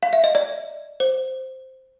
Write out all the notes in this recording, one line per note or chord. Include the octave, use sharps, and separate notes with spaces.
F5
E5
D#5
D5
C5